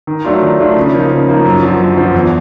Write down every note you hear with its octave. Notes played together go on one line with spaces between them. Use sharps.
D#3
F#3 A3 D4 F4
D#3
F#3 A3 D4 F4
C#3
F3 A#3 D#4
C#3
F3 A#3 D#4
F#2
D3 F3
F#2
D3 F3
E2